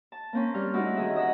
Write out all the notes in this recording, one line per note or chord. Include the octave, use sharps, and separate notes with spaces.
A5
A#3 C4 C#4
G3 F6
A3 D#4 E4 F#4
D#3 G#4 E5
D#5 E5 F#5